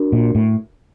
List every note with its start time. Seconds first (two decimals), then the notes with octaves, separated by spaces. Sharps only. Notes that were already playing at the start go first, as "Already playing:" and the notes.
Already playing: D4 F#4 A#4
0.12 A#2
0.35 A2